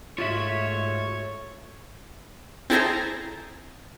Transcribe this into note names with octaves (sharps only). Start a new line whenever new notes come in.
G#2 A3 F4 F#4 C#5 E5
C4 E4 G#4 A4 C5 A#5